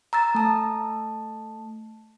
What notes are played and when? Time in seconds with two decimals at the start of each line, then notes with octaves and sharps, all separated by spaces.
0.13 A#5 E6 A6
0.35 A3 A5